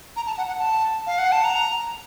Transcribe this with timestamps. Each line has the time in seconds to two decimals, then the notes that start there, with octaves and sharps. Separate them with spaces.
0.16 A#5
0.27 A5
0.38 F#5
0.48 F#5
0.58 A5
1.07 F5
1.18 F#5
1.32 A5
1.44 A#5